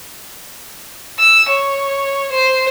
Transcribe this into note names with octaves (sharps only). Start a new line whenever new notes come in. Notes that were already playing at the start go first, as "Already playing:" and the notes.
E6
C#5
C5